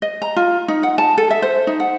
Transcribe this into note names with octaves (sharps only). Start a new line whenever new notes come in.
D#5
A#5
F4
D#4
F#5
A5
A4
E5
C5
D#4
F#5